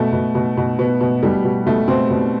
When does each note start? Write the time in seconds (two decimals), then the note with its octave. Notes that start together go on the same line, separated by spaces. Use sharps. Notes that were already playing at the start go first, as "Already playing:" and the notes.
Already playing: B2 A3
0.13 B2
0.35 B2
0.57 B2
0.79 B2 B3
1.00 B2
1.23 B2 G3
1.44 B2
1.66 B2 A3
1.88 B2 C4
2.10 B2